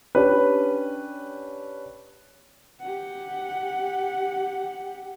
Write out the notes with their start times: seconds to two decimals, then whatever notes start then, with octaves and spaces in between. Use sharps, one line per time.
0.15 C#4 D4 G4 B4
2.81 G4 F#5